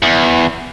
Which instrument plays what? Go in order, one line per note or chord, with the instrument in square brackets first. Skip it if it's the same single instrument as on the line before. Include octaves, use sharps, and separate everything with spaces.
[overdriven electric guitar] E2